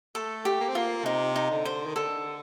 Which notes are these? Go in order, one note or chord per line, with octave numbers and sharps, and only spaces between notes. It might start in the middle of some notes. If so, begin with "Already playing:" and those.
A3 A4
G4
A#3
C4
A#3 F4
C3 D#4
D#4
D3
C5
D#3
D3 A4